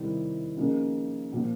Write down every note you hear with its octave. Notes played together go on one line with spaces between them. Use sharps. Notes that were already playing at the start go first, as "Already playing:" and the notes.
Already playing: C3 D#3 G3 C4 E4
C#3 F3 A#3 D#4
A#2 F3